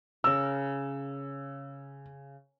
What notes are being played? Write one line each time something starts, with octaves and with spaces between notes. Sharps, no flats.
C#3 A#4 E6